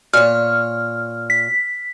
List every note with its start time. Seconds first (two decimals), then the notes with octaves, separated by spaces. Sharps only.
0.13 A#2 C#5 F6
1.30 B6